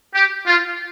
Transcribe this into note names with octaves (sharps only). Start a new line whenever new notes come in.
G4
F4